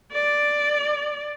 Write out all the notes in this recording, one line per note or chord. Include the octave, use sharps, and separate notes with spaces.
D5